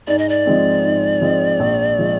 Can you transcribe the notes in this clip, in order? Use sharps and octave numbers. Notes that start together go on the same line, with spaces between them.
G#2 D5
D#5
D5
F3 G#3 C4
G#2
F3 G#3 C4
A#1
F3 G#3